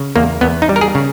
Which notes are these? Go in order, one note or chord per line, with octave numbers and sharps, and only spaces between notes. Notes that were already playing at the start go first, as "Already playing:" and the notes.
Already playing: C#3
E2 A#3
E2 B3
D#4
G3
A#4
G#4
C#3